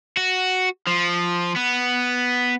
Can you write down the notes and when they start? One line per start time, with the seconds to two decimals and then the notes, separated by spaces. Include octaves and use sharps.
0.17 F#4
0.87 F3
1.56 B3